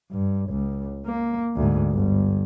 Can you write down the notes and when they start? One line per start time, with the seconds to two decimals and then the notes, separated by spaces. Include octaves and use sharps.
0.11 G2
0.50 C#2
1.06 A#3
1.56 D2 G#2
1.91 G1